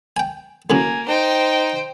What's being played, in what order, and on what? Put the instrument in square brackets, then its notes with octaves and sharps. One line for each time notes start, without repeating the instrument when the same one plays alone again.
[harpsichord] G5 G#5
[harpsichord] A2 C#3 F#3 [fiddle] A#3 [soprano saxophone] G#5
[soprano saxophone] D#4 [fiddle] C5 G5